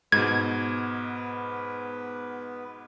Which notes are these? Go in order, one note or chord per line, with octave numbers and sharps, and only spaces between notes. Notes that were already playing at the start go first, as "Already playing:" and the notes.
G#2 B2 B3 B4 G#6